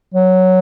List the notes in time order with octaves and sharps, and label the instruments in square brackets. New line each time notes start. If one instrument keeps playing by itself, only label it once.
[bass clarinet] F#3